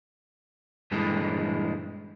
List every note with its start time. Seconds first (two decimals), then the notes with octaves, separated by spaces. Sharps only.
0.91 G2 A#2 D3 E3 G#3